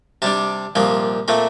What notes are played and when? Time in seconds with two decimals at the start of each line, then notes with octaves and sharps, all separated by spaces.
0.22 C3 G3 D4 A5
0.75 C2 A#2 F3 C4
1.28 A#2 A3 C4